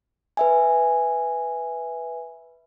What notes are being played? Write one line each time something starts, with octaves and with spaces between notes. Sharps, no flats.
B4 E5 G#5